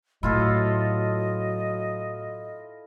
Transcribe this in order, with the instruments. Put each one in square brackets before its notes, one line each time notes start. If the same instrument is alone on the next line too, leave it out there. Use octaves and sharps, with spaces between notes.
[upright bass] A2 [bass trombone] F#3 [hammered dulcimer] E4 F4 A4 [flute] D#5